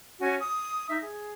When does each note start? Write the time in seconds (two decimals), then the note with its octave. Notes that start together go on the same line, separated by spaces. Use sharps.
0.20 C#4 F#4 G#5
0.40 D#6
0.89 D#4 E5
1.02 G#4